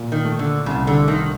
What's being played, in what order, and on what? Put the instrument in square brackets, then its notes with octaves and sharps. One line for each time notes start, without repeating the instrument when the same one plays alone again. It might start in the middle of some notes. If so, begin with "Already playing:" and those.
Already playing: [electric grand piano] A#2
[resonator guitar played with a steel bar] D#3
[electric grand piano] A3
[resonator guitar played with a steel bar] D3
[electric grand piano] C2 [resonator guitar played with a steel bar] C#3
[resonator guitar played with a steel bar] D3
[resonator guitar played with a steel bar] D#3 [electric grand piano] A3